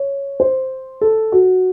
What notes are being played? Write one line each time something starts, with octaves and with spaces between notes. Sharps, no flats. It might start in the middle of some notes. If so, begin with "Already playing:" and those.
Already playing: C#5
C5
A4
F#4